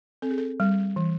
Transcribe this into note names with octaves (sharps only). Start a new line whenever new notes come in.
C4 A4
G#4
A4
G3
E3